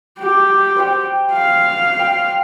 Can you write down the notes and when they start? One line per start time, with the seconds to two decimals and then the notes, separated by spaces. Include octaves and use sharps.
0.19 G4
0.76 C5 F#5 G5
1.32 F5
1.99 G5